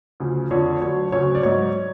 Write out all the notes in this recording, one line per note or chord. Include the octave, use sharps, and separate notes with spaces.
D2 C#3 F3
F2 D3 F3 C#5
D2 D3 F#3 C#5
D2 C#3 F#3 C#5
D5
G#2 F#3 C#5